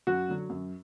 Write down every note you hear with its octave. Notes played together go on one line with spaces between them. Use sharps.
F#2 F#4
D3 F#3
F#2